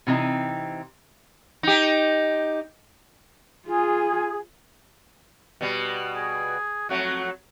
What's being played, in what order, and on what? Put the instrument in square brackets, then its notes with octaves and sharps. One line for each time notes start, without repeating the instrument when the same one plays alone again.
[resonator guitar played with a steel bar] C3 E3 C4 D#4
[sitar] D#4 G4
[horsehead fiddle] F4 [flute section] G#4
[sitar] B2 G3
[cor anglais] G#4
[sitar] F2 F#3 A3 [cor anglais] F#4